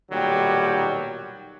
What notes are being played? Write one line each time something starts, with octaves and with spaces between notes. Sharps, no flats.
B1 A#2 D#3 F#3 G3 G4